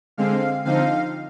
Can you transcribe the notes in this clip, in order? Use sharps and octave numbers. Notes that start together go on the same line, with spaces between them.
D3 G#3 C4 F5
D3 F3 C4 D#4 F5